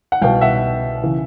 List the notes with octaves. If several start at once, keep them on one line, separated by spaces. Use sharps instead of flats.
F#5
C2 B2 F5 G5
E5 F#5
C#3 E3